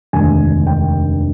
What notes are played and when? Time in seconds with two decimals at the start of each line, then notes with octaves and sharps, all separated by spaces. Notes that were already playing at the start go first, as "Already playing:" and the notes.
0.13 F1 D#2 D3 G#3 G#5
0.67 G5